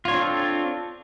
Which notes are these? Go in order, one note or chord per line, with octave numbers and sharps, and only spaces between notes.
C4 D4 F4 A4 C#5